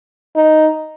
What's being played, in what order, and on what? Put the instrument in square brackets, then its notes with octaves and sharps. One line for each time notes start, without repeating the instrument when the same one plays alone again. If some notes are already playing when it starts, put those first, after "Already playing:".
[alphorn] D#4